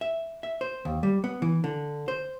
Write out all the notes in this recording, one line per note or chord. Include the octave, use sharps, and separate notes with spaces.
E5
E5
C5
D#2
G3
B3
E3
D3
C5